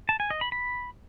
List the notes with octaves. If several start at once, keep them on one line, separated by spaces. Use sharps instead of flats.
A5
G#5
D#5
B5
B5